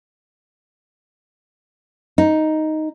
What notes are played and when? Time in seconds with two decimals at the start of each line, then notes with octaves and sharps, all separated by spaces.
2.18 D#4